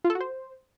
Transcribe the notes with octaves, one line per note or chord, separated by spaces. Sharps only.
F4
A4
F#4
C5